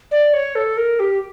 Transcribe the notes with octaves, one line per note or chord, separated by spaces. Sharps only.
D5
C#5
A4
A#4
G4